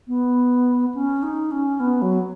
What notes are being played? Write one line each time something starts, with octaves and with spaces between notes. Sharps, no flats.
B3
C#4
D#4
C#4
B3
F#3